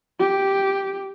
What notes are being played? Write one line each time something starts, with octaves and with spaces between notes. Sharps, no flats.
G4